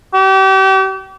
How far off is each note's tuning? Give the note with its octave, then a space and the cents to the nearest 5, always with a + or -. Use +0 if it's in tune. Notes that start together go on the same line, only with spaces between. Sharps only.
G4 -35